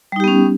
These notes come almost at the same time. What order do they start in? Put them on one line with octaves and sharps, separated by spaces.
G3 D#4 G4 B3 C#4